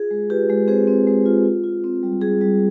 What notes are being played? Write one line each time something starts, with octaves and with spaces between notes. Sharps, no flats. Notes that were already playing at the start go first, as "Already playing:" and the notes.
Already playing: F4 G#4
G#3
F4 G4 B4
G#3
C4 G#4 C5
C4
G#3
F4
F4
F4
C4
G3
G3 G#4
G3